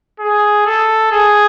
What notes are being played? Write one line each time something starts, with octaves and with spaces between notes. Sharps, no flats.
G#4
A4
G#4